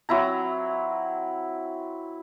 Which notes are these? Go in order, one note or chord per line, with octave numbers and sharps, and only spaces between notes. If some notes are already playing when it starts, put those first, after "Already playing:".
F#3 C4 E4 A#5